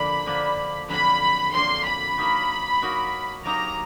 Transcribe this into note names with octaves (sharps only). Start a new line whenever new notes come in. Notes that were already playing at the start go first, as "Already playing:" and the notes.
Already playing: D3 F3 A#3 D4 B5
D3 F3 A#3 D4
F2 D3 F#3 A#3 D4 B5
F2 D3 F#3 A#3 D4 C6
B5
F#3 A#3 D#4 F#4 A#4
F#3 A#3 D#4 F#4 A#4
F#3 A#3 D#4 G4 A#5